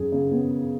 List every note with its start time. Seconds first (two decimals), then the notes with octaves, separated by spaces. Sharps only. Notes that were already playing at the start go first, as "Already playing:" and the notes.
Already playing: F#2 G#4
0.12 C#3
0.32 B3